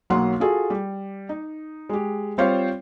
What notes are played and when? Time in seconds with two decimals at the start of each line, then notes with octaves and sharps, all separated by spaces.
0.10 B1 F#3 A#3 F#5 C6
0.40 F4 F#4 G#4 A4
0.70 G3
1.29 D#4
1.89 G#3 G4
2.38 G3 C4 F4 C5 C#5 F5